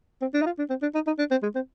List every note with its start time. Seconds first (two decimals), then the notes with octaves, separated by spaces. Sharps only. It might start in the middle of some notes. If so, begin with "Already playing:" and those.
0.22 C4
0.34 D4
0.42 D#4
0.46 F4
0.59 D4
0.70 C4
0.82 D4
0.95 D#4
1.07 D#4
1.19 D4
1.31 C4
1.43 G#3
1.55 C4